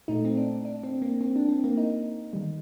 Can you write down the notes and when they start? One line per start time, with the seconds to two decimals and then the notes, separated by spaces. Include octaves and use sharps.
0.08 A#2 A3 D#4
0.25 C4
0.37 D4
0.65 D4
0.83 C4
1.02 A#3
1.21 C4
1.36 D4
1.49 C4
1.64 A#3
1.77 D#4
2.33 D#3 G3